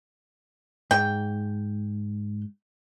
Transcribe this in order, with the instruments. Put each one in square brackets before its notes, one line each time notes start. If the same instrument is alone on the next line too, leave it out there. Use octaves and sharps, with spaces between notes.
[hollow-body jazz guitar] G#2 [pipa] G5